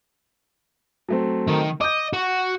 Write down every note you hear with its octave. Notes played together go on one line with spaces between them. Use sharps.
F#3 A3 C4
D#3
D#5 D6 G6
F#4